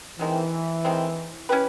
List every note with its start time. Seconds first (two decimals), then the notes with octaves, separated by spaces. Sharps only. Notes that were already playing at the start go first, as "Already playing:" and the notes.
0.19 C3 D#3 E3 G#3 C4
0.85 C3 D#3 G#3 C4
1.49 C#4 E4 G4 B4